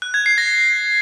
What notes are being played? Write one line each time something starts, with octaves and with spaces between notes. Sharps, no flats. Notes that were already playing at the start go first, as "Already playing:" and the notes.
F#6
G#6
C7
A#6